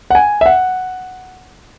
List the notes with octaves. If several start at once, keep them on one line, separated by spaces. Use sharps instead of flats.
F#5
G#5
E5
F#5